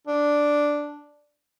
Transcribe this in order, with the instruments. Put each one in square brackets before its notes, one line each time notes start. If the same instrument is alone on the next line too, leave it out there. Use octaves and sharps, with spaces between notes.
[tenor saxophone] D4